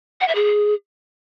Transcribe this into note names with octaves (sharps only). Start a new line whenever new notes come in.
F#5
E5
G#4